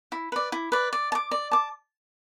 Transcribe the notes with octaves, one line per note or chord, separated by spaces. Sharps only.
E4
B4 D5
E4
B4 D5
D5
A5
D6
D5
A5 D6